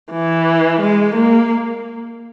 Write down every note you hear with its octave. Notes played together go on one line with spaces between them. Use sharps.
E3
G#3
A#3